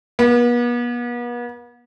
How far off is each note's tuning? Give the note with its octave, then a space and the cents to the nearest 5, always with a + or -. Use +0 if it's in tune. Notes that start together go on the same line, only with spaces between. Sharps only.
B3 -40